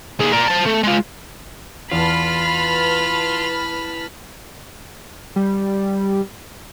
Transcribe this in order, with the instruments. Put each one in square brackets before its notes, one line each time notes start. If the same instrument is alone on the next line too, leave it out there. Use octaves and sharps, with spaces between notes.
[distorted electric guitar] D#2 G#4
A#4 D5
C5 A5
A3
G#3 F4
[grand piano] E2 [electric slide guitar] F4 [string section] B4 A5 F6 [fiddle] B5
[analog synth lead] G3